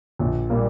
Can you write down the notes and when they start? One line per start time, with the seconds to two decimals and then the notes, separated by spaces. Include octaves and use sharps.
0.19 A#1
0.50 A#2 G3 A#3